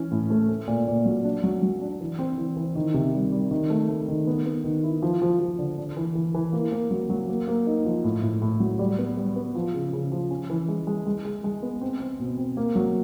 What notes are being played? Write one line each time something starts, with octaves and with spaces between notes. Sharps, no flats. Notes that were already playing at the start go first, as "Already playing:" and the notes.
Already playing: E3 C#4
A2
A3
A3
A#2
A#2
F#3
D4
F#3
F#3
D4
E3
C4
E3
E3
D#3
C3
G3
G3
D#3
A3
A3
D#3
B3
B3
D#3
E4
F3
F3
F3
D3
D4
E3
E3
E3
A#3
A#3
F#3
F#3
A#3
A#3
D#4
F3
A2
A2
A2
F#3
G3
B3
G3
B3
F3
C#3
C#3
F3
C#4
E3
G#3
G#3
G#3
G#3
G#3
B3
C4
C4
B2
C4
A#3
F#3